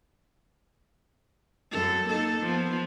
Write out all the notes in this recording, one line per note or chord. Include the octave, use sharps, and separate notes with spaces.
F#2 A4
A#3 D#4 A4
F3 B3